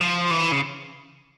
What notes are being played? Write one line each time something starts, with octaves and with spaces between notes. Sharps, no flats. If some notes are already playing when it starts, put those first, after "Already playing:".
F3
E3
C#3